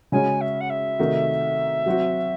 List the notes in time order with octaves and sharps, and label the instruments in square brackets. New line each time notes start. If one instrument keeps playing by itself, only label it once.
[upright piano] C#3 G#3 C#4 F#4 C#5 [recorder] G#5
[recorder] E5
F#5
E5
[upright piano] C3 D#3 A3 D#4 F#4
F#3 C4 F#4